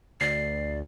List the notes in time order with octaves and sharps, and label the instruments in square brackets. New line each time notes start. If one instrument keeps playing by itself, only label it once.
[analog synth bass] D2 [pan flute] D5 [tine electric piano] C7